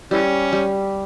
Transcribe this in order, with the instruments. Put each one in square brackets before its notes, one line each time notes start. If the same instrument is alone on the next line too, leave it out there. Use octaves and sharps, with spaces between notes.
[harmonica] E3 C#4 [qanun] G3
[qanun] G3